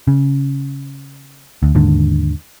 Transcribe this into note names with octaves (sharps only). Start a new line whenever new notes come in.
C#3
D2
D#2 G#2 D3